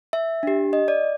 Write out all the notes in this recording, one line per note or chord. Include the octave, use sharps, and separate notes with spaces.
E5
D4 G4
D#5
D5